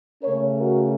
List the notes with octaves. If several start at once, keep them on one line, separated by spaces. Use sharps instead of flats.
C#3 A3 C#4 A#4 C#5
F#4 A#4